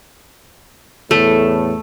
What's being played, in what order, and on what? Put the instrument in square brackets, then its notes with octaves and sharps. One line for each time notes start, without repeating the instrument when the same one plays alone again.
[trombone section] E2 A2 [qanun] A3